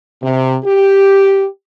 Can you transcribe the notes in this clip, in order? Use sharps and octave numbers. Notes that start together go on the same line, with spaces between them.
C3
G4